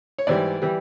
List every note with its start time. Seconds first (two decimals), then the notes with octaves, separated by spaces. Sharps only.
0.19 C#5
0.27 G#2 E3 G3 D5
0.62 E3 G3